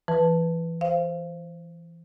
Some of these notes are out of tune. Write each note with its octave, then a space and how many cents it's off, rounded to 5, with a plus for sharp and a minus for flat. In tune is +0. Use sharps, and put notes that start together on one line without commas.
E3 +20 B4 +0 A5 +0
C5 +0 F5 -25